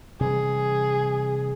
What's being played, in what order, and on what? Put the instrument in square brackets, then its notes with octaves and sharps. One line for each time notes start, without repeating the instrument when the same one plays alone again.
[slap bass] C3 E3 G3 [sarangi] G#4